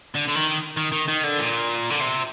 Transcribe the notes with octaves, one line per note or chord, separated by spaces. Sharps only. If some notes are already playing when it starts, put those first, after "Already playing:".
D3
D3
D#3
D#3
D#3
D#3
D3
A#2
D3
C3